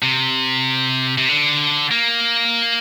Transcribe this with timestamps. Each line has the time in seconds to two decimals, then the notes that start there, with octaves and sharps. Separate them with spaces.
0.02 C3
1.18 C3
1.29 D3
1.91 A#3